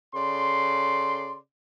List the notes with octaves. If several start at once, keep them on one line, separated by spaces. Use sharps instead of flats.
C#3 A4 D5 C6